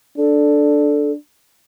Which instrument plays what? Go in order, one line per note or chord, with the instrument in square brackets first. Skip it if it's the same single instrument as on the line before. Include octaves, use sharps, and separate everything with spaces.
[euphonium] D4 [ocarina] A4